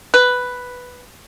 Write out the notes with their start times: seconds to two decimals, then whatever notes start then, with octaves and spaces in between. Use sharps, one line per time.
0.14 B4